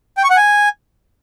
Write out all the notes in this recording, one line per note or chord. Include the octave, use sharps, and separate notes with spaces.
G5
C#6
F#5
G#5